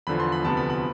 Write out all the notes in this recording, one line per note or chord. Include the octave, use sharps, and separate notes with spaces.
E2 D3 F3 B5
C6
B5
D2 C3 F3 B3 A5
B5
B5